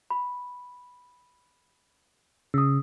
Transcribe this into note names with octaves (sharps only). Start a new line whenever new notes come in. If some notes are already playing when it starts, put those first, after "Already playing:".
B5
C#3 D#6 E6